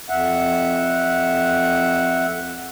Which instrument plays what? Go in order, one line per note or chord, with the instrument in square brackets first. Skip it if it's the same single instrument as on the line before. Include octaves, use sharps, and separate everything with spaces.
[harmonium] F2 E5 F#5